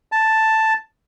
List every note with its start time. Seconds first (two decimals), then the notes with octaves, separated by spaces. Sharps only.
0.12 A5